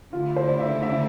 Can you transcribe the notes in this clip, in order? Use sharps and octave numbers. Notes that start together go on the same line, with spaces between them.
D3 A3 E4 F4
C5
D5
E5
E5